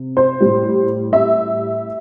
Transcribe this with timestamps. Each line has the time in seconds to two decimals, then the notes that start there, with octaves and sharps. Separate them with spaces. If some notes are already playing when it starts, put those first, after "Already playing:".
Already playing: C3
0.17 C5
0.40 A2 G3
1.13 E5